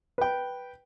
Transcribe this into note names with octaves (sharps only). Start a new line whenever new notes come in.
B4 G5